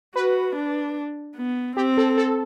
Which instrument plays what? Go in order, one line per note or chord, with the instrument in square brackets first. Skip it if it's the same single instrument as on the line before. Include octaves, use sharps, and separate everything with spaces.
[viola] F#4 [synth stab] B4
[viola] D4
B3
[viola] C4 [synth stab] G4
[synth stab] A4
A4